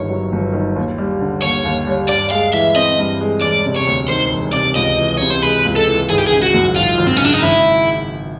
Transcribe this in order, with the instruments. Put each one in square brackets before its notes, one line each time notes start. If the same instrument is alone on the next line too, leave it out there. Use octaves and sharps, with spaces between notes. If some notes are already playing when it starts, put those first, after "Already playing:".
Already playing: [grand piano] G1 G2 D#3 [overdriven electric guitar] C#5
[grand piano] F#3
G1
D#3
D#2
G3
D3
[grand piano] D#2 [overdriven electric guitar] C#5
[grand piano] D#2
G3
[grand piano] G2 [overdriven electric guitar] D5
[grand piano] G#3 [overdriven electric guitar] F5
[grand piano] E3 [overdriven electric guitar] E5
[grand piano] C4 [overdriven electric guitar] D#5
[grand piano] G2
G#3
[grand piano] E1 [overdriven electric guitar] D5
[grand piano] C3
[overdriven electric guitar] C#5
[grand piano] D2
[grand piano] D#3 [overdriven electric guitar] C5
[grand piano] E1
[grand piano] C3 [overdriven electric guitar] D5
[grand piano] C#2 [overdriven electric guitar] D#5
[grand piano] E3
[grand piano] C3 [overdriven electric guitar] C#5
[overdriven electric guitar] C5
[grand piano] G#3 [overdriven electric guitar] B4
[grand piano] C#2
[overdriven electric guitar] A4
[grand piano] E3
[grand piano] G#1 [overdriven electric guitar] G#4
[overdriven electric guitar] G4
[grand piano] C#3 [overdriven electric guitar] G#4
[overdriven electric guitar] F#4
[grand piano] F#2
[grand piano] G#1 [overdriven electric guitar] F4
[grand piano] G#1
[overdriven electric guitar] C4
C#4
[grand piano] C#3 [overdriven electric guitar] D4
[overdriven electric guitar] D#4
[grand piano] G#1 [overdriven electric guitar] E4